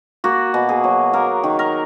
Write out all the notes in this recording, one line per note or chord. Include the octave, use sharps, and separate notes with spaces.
A#3 F#4
B2
G#4
F#3
A#3 A#4
D#3
A#4